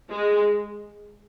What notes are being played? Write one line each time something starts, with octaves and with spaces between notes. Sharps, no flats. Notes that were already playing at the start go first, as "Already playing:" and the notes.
G#3